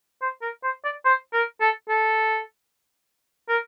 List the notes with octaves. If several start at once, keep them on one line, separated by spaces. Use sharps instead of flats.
C5
A#4
C5
D5
C5
A#4
A4
A4
A#4